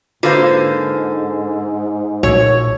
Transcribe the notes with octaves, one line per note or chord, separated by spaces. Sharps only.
G#2 D3 A#3 F4 F#4 B4 C5
A#1 F#4 C#5 E6